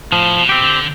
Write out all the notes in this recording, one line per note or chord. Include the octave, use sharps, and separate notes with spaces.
A2 F3
B2
C4 G4
D3